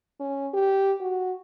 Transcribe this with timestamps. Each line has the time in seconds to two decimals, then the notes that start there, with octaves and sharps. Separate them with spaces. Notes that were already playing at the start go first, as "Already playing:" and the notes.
0.20 C#4
0.54 G4
1.01 F#4